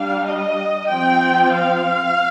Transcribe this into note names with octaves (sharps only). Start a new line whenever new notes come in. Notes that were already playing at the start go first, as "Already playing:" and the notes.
Already playing: G3 D4 F5
D#5
F3 C4 G5
F5